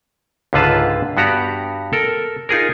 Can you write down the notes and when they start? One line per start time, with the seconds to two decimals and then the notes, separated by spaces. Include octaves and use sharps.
0.53 C#2 G#2 D3 F4 B4 A5
1.17 G2 B3 F#4 G4 A#5
1.93 A4 A#4
2.49 D#4 F4 G#4 A#4